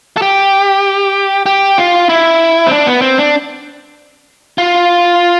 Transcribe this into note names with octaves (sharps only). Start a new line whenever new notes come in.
A4
G4
G4
F4
E4
C4
D4
B3
C4
D4
F4